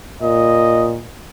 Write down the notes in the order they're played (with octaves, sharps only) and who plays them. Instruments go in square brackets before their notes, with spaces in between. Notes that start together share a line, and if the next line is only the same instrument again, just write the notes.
[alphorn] A#2 [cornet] D#5